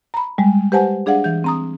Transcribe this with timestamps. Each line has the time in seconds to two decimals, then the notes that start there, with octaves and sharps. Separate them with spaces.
0.14 A#5 B5
0.38 G3 G#3
0.72 G4 B4 C5 F#5 G#5 A5
1.06 D4 G#4 D5 F5 F#5
1.24 E3 G6
1.44 C4 A#5 D#6